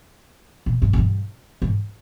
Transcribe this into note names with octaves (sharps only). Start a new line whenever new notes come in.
A#2
G2
G#2
G2
G#2